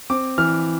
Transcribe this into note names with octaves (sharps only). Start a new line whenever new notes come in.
C4 D6
E3 F6